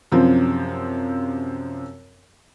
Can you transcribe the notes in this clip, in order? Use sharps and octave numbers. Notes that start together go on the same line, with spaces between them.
F#2 C3 F3 C4